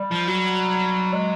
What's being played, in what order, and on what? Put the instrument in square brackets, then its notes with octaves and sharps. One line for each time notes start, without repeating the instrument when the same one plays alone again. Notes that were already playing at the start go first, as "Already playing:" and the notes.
Already playing: [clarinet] G3
[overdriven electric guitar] F3
F#3
[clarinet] G#3